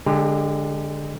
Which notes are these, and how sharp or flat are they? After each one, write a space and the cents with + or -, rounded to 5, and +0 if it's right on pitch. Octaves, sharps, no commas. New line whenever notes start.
D3 +0 G#3 -10 G4 +25